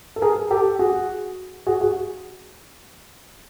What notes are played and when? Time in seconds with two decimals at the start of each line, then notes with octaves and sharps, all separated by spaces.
0.16 A4
0.22 G#4 A#4
0.51 G4 A4
0.79 F#4 G#4
1.66 F#4 G#4
1.81 F#4 G#4